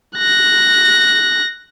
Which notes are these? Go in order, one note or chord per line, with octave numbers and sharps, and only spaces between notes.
F#6 A#6